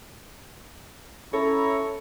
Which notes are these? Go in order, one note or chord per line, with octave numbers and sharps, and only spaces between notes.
C#4 E4 A4 C#5 A#5